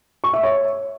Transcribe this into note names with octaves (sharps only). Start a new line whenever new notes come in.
C#6
E5
C#5